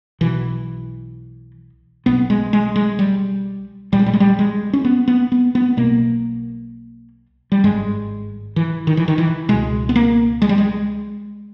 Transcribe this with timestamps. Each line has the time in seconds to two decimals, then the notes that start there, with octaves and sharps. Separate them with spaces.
0.21 B1 B2 E3
2.06 B1 B2 B3
2.30 G#3
2.53 G#3
2.76 G#3
2.99 G3
3.92 A#1 A#2 G3
3.99 G#3
4.06 G3
4.13 G#3
4.20 G3
4.39 G#3
4.73 C#4
4.85 B3
5.08 B3
5.32 B3
5.55 B3
5.77 B1 B2 A#3
7.52 G3
7.64 G#1 G2 G#3
8.56 E3
8.87 D#3
8.97 E3
9.08 D#3
9.18 E3
9.49 C#2 B2 G#3
9.89 B3
9.96 A#3
10.42 G#3
10.49 G3
10.58 G#3